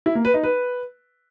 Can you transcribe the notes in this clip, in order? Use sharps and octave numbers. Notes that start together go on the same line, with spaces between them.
E4
A#3
B4
D#4
B4